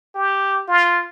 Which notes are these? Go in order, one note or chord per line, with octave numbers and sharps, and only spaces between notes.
G4
F4